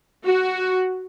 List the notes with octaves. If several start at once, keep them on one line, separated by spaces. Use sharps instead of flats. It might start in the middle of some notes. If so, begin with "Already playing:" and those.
F#4